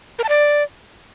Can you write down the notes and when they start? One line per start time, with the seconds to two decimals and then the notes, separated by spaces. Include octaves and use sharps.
0.19 A#4
0.24 A5
0.29 D5